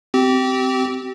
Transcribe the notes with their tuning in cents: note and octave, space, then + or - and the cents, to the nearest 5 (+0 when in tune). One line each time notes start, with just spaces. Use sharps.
C4 -15 G4 -30